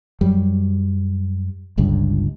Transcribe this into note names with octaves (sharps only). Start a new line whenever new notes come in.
F#2 F#3 G3
G1 C#2 G2